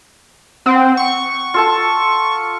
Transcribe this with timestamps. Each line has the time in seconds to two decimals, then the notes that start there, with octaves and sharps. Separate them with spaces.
0.66 C4 F#5
0.97 C#6
1.54 F4 A4 A5